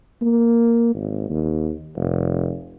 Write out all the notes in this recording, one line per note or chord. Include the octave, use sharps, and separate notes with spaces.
A#3
G#1
D#2
F1